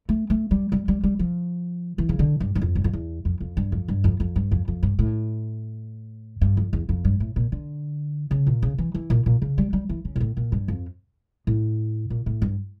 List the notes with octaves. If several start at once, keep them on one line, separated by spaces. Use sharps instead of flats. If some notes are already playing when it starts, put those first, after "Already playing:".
A3
A3
G3
G3
G3
G3
F3
E3
C#3
D3
G2
G2
F2
G2
F2
E2
F2
F2
G2
F2
G2
F2
F2
G2
F2
F2
G2
A2
G2
F2
E2
F2
G2
A2
A#2
D3
C#3
A#2
C#3
E3
E3
A#2
A#2
C#3
G3
G3
E3
C#3
A#2
A2
A#2
G2
F2
A2
A#2
A2
G2